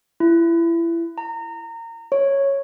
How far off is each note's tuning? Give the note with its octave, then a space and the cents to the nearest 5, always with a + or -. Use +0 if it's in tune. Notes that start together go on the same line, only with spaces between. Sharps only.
E4 +25
A#5 -25
C#5 -5